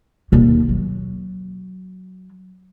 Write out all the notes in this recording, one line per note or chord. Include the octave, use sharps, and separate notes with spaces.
D#2 B2
F#3